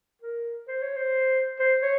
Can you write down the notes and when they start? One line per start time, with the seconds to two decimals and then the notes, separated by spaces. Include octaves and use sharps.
0.22 A#4
0.68 C5
0.82 C#5
0.96 C5
1.59 C5
1.82 C#5